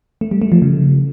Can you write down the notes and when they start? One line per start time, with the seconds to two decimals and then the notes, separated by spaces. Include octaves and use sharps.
0.21 A3
0.31 G3
0.42 A3
0.52 F3
0.62 C#3